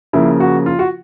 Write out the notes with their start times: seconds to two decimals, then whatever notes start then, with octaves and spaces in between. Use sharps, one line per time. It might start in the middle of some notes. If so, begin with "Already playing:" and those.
0.13 C#3 F3 A#3 E4
0.40 F#4
0.66 F4
0.79 F#4